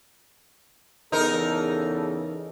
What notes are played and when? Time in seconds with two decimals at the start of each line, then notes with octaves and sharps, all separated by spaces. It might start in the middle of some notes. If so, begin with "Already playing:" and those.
1.12 E2 C#3 D#4 A4 A#4